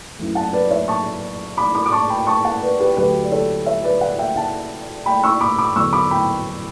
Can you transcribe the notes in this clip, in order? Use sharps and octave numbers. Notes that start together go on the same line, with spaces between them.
F#2 E3 A3
F#5 A5
B4 D5
C#5 E5
A5 C#6
B5 D6
B5 D6
D6
A5 C#6
G5 B5
A5 C#6
F#5 A5
B4 D5
G4 B4
D2 D3 F#3 A3 G4 B4
D5
A4 C#5
C#5 E5
B4 D5
D5 F#5
E5 G5
F#5 A5
G5 B5
C#6 E6
B5 D6
B5 D6
E2 D3 F#3 C#6 E6
B5 D6
G5 B5